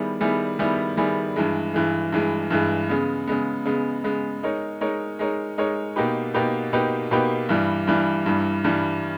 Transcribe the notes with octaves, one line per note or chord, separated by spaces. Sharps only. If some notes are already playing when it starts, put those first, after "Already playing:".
Already playing: D#3 G3 B3 E4 G#4
D#3 G3 B3 E4 G#4
D#3 G3 B3 E4 G#4
D#3 G3 B3 E4 G#4
G2 E3 G#3
G2 E3 G#3
G2 E3 G#3
G2 E3 G#3
C#3 G#3 B3
C#3 G#3 B3
C#3 G#3 B3
C#3 G#3 B3
G#3 D#4 A#4 C#5
G#3 D#4 A#4 C#5
G#3 D#4 A#4 C#5
G#3 D#4 A#4 C#5
B2 A#3 D#4 G4 B4
B2 A#3 D#4 G4 B4
B2 A#3 D#4 G4 B4
B2 A#3 D#4 G4 B4
G2 E3 G3
G2 E3 G3
G2 E3 G3
G2 E3 G3